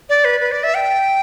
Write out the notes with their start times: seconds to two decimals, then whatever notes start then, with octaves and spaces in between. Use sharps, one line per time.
0.09 D5
0.25 B4
0.40 B4
0.52 D5
0.64 E5
0.75 G5